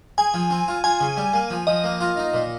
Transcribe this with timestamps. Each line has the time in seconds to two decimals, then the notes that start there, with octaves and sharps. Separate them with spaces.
0.18 G#4 G#5
0.34 F3
0.50 C4
0.68 F4
0.84 F4 G#5
1.01 C#3
1.17 G3
1.33 A#3
1.50 F3
1.67 F3 D#5
1.84 A#3
2.00 F4
2.17 D#4
2.34 A#2